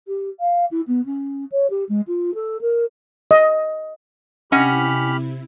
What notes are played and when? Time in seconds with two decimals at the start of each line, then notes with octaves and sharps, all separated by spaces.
0.07 G4
0.40 F5
0.71 E4
0.87 B3
1.05 C#4
1.51 C#5
1.70 G4
1.89 G#3
2.07 F4
2.34 A4
2.61 A#4
3.31 D#5
4.52 C3 C#4 E4 G4 D#5 F#5 B5 F6